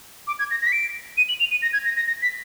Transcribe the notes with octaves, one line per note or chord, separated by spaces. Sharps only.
D6
G#6
A#6
A#6
B6
D7
D#7
F#7
F7
D#7
A#6
G#6
A#6
A#6
A#6
B6